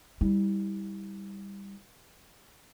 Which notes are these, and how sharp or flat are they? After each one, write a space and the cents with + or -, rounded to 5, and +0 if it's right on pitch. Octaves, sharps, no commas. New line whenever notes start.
G3 +10 E4 -30